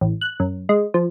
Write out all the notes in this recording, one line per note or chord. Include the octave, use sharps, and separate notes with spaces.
A1
F#6
F#2
G#3
F3